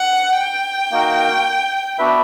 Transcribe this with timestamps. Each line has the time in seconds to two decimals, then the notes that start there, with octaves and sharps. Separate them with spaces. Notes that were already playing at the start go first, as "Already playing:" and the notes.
Already playing: F#5
0.38 G5
0.91 A#3 D#4 F#4 A#4
1.98 B3 D4 F#4 B4 E5